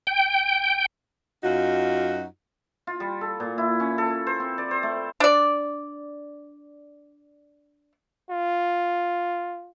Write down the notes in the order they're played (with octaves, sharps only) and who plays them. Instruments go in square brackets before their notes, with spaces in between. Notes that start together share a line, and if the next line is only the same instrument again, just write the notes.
[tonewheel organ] G5
[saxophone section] F#2 D#4 F4 F#4
[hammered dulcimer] F4
G3
A4
A#2
E4
C#4
A4
C5
C4
D5
C5
A3
[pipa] D4 D5
[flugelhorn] F4